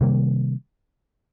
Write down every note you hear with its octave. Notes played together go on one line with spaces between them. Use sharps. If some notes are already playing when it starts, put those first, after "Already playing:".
C3 D#3 G3 A#3